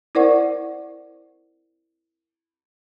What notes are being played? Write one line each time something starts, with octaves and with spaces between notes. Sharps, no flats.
E4 A#4 C5 D5 F#5 C#6